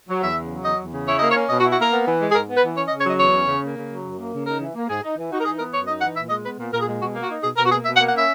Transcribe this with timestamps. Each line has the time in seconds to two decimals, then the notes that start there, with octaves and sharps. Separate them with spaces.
0.09 F#3
0.23 E2 E5
0.37 C#3
0.51 F#3
0.64 E2 D#5
0.79 E2
0.93 C#3
1.07 E4 C#5
1.19 A#3 D#5
1.31 C#5
1.36 C#4
1.50 B2 D#5
1.60 F#4
1.63 E4
1.71 F#4
1.79 A#3 A#4
1.92 B3
2.06 E3
2.21 G#3
2.30 G#4
2.34 G#2 A#4
2.49 B3
2.56 B4
2.63 E3
2.77 C#4 C#5
2.88 D#5
2.91 C#3
2.98 C#5
3.05 F#3 D#5
3.19 E2 C#5
3.34 C#4
3.48 C#3
3.62 A#3
3.76 C#3
3.90 F#3
4.04 F#2
4.18 A#3
4.33 C#3
4.47 D#4 A#4
4.60 E3
4.75 A#3
4.89 G#2 G#4
5.03 D#4
5.17 E3
5.31 D#4 F#4
5.41 A#4
5.45 E3 G#4
5.59 B3 A#4
5.74 F#2 C#5
5.87 D#4 D#5
6.01 E3 F#5
6.15 A#2 E5
6.30 G#3 D#5
6.44 B3 B4
6.58 A#2
6.72 A#2 A#4
6.80 G#4
6.87 G#3
7.01 B2 F#4
7.15 A#3
7.22 F#4
7.29 D#4
7.44 B2 G#4
7.57 B2 A#4
7.66 F#4
7.71 A#3 G#4
7.86 B2 E5
7.97 F#5
8.00 A#3
8.07 F#5
8.14 C#4 E5